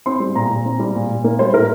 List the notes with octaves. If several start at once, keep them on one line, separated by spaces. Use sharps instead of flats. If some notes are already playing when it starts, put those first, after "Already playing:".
C4 C6
G3
A#2 A#5
A#2
C4
G3
A#2
A#2
A#3
G3 C5
A2 A#4